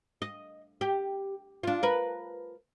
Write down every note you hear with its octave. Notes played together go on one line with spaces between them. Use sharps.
D#5
G4
D4 F4
A#4 B4